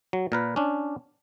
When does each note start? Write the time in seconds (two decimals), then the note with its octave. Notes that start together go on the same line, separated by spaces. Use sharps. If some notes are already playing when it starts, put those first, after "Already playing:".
0.13 F#3
0.32 A#2 A#4 B4
0.56 C#4 D4